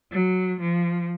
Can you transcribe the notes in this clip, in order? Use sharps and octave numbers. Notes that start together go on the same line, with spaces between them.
F#3
F3